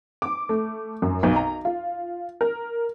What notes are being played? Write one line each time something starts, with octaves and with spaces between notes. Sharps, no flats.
D6
A3
F#2
B1
A#5
F4
A#4